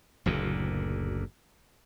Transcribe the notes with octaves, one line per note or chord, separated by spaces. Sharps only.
F#1 D2 A#2